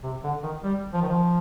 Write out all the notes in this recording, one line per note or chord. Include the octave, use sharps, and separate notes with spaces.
C3
D3
D#3
G3
F3
D#3
F3